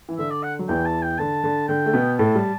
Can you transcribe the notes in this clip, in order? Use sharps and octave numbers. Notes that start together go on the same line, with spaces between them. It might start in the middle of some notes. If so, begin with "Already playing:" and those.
E3
D3 E5
D5
F#5
F#3
E2 E3 G5
A5
G5
D3 A5
D3
D3 G5
A3
B2 B3
A2 A3 A5
G3